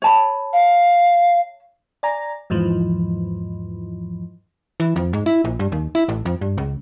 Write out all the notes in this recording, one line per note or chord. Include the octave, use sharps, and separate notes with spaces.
C#5 A5 B5
F5
D5 G#5 A#5
E2 G#2 E3 F3
E3
F2
G#2
E4
A#1
G2
D#2
E4
A1
F2
G2
C#2